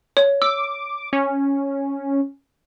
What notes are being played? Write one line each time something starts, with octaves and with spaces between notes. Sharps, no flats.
C#5
D6 E6
C#4